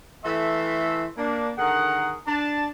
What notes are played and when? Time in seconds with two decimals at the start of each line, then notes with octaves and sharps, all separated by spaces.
0.24 E3 A3 A4 E5 F5 C6
1.17 A#3 D4
1.58 D3 D#3 G#4 A#4 F#5
2.26 D4 A5